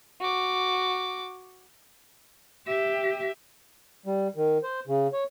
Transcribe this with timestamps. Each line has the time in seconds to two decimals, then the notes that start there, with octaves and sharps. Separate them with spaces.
0.20 F#4 D6
2.67 G4 E5
4.06 G3
4.36 D#3
4.63 C5
4.87 C#3
5.13 C#5